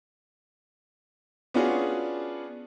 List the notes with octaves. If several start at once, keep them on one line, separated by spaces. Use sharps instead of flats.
B3 C#4 D4 F4 F#4 G#4